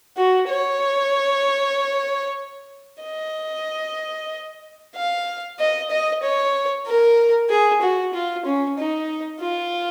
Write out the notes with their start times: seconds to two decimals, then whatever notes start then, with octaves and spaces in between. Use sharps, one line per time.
0.17 F#4
0.49 C#5
3.04 D#5
4.95 F5
5.59 D#5
5.90 D#5
6.23 C#5
6.86 A#4
7.50 G#4
7.82 F#4
8.14 F4
8.45 C#4
8.77 D#4
9.41 F4